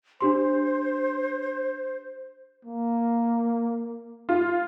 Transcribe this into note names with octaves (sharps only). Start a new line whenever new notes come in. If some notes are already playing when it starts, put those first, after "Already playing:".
D4 G4 C5 C6
A#3
F4